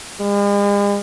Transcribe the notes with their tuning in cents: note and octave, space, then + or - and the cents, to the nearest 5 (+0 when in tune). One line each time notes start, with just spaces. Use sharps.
G#3 -45